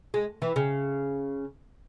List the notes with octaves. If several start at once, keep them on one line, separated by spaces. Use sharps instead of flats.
G#3
E3
C#3